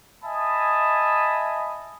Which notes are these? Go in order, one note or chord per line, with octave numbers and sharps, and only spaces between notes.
D#5 E5 G#5 A5 B5 D#6